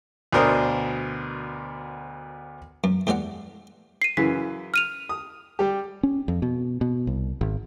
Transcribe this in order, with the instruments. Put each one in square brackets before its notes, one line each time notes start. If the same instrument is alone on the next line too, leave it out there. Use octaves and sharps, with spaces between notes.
[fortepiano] D2 B2 D4 A#4 C5 D#6
[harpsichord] F#2
E2 G3 G#3 D5 F#5
[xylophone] C7 D#7
[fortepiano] F#2 C#3 E3 [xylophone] B6
[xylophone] F6 D#7 F7
[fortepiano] D#6
G3 G4
[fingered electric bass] C#4
F2
B2
B2
C2
G#1